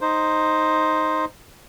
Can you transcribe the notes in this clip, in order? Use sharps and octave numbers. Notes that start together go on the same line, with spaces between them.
D#4 C5